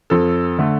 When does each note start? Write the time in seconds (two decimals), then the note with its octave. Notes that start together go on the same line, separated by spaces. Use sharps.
0.10 F2 A4
0.59 D3 A3